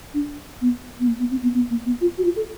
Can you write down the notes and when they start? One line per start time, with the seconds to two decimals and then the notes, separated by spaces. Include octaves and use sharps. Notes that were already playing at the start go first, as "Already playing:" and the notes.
0.14 D4
0.61 B3
1.00 B3
1.07 A#3
1.19 B3
1.31 C4
1.42 B3
1.55 B3
1.70 A#3
1.86 B3
2.01 F4
2.18 F#4
2.25 F4
2.36 A4